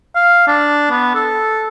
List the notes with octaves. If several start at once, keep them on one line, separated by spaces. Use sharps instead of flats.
F5
D4
B3
A4